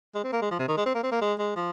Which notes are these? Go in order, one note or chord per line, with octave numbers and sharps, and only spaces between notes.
G#3
C4
A#3
G#3
F3
C3
D#3
G#3
C4
A#3
C4
A#3
G#3
G#3
F3